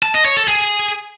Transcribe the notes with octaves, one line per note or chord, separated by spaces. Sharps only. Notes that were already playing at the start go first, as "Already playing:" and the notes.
A5
D#5
C#5
A4
G#4